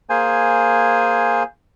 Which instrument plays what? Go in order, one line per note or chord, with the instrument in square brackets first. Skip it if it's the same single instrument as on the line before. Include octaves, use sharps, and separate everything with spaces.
[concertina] A#3 G#4 C5 G#5